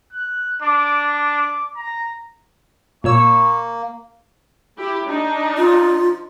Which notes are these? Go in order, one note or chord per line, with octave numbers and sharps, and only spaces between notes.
F#6
D4 D6
D6
A#5
A#2 A#3 C#5 C#6 E6
E4 G4
D4 D#4
F4